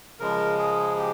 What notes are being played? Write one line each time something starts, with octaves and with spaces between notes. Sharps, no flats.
C#3 F3 G#3 A#4
G#4
G4